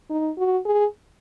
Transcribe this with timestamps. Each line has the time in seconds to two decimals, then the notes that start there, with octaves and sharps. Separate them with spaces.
0.10 D#4
0.38 F#4
0.66 G#4